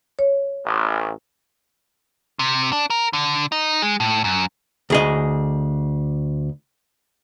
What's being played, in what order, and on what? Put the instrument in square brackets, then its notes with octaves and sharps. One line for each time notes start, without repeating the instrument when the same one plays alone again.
[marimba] C#5
[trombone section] A1
[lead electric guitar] C3
D4
A#4
D3
D#4
G#3
A2
F#2
[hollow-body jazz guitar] D2 G#4 D#5